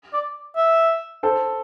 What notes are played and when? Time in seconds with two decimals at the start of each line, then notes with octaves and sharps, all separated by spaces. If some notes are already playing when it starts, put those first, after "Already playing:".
0.13 D5
0.57 E5
1.23 A4 C5